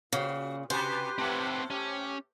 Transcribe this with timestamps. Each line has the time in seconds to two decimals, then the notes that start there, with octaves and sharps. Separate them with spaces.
0.13 A#2 C#3 F#4 B4 C5
0.70 C3 F#4 G4 B4 C5
1.18 A2 A3 C4 F#5
1.70 C#4 G4